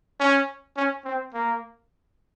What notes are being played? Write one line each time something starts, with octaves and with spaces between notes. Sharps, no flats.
C#4
C#4
C4
A#3